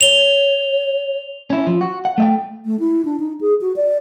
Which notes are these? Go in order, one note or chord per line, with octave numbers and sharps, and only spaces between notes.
C#5 F7 G7
C#4 E4
F3
F#4
F#5
A3 E5 G5
A3
E4
D4
D#4
G#4
F#4
D5